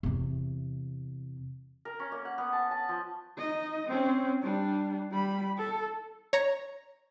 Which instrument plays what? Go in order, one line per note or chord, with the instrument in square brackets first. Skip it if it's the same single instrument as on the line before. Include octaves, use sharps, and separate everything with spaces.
[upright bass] E2 C3
[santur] A#4
C#4
A#3
F#5
B3
A5
A5
F3
[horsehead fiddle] D#4 D#5
C4 C#4
G3 D4
G3 B5
A4
[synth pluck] C#5 A#5